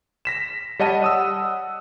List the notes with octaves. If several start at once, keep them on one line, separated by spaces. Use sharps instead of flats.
A#6 B6 E7
G3 C#5 D#5 F#5 A5 D#7
F#5 D#6 E6